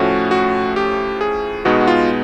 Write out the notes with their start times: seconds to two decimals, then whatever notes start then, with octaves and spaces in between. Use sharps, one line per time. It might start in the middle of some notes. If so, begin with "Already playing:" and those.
Already playing: A2 F3 A3 C#4 F#4
0.31 F#4
0.76 G4
1.21 G#4
1.65 B2 G#3 B3 D#4 F#4
1.81 F#4
1.87 F4